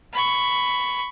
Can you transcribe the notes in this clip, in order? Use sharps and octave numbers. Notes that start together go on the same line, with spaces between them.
B5 C#6